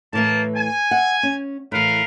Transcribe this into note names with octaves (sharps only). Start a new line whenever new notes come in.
A2 E3 A3 A#3 A5
G#5
E5 F#5
C#4
A2 E3 A#4 B4 F5